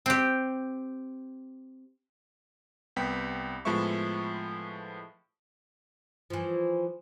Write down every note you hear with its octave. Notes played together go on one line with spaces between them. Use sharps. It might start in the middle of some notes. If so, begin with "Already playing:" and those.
C4 G4
C2 B3 G5 B6
A2 F3 G#3 B3 E5 C#6
E3 F3